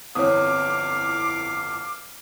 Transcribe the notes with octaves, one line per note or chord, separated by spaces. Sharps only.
G1 F2 E3 C#5 F5 D6 D#6